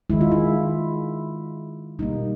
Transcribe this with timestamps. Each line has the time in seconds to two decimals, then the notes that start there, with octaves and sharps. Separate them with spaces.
0.10 D#3 G#3 E4
0.21 F4
0.32 E4
1.99 B2 G3 A#3 D#4